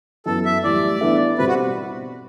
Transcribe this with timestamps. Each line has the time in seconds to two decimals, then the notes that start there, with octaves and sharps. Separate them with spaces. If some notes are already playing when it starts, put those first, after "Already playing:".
0.26 F#2 E3 B3 A4
0.45 E5
0.64 A2 E3 G3 D5
1.01 E3 B3 D4 A4 E5
1.38 B2 G3 C4 B4
1.48 F#4